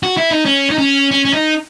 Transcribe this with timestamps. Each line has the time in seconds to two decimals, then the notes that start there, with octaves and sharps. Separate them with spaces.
0.03 F#4
0.17 E4
0.31 D#4
0.45 C#4
0.70 D#4
0.78 C#4
1.11 C#4
1.25 C#4
1.33 D#4